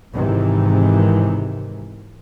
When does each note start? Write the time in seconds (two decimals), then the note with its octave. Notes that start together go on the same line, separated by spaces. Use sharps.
0.14 G#1 G#2 C3 D#3 E3